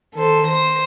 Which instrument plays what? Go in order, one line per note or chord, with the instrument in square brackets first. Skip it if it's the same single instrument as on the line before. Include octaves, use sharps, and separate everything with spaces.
[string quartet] D#3 A4 C5
C5 A#6